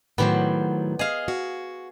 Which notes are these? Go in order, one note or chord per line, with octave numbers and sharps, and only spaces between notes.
A2 D#3 F#3 B3 G4 C5
G#4 D#5 F5
F#4